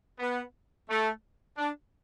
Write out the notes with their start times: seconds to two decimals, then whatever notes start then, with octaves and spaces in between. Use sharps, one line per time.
0.19 B3
0.88 A3
1.57 D4